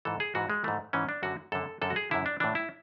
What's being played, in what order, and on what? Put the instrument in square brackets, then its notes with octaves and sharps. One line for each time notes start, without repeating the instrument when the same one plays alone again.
[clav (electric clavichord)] G#2 E3 A4
G#4
G#2 E3 F#4
G#3
G#2 E3 A3
G#2 E3 C#4
D4
F#2 D3 F#4
F#2 D3 A4
F#2 D3 A4
F#4
G#4
F#2 D3 E4
D4
A2 E3 D4
E4